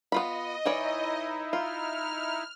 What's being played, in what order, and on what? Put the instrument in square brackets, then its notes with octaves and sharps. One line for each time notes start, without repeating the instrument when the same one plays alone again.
[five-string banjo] B3 F4 B5 [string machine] D#5
[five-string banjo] E3 C#5 D5 [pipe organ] D#4 E4
[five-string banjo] F4 [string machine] F6